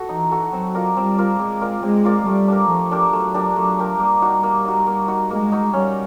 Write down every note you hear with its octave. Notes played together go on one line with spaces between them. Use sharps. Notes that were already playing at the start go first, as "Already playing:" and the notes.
Already playing: F#4 A4
E3 D#4
F#4 A4
F#3 C4
F4 A#4 D5
G3 C4
F4 A#4 D5
G#3 C4
F4 A#4 D5
G#3 C4
F4 A#4 D5
G3 A3
D4 G4 A#4
F3 A3
D4 G4 A#4
F#3 A3
D4 G4 A#4
F#3 A3
D4 G4 A#4
G3 A#3
D#4 F#4
A#3
D#4 F#4
A#3
D#4 F#4
G#3 A#3
D#4 F#4
G3 C#4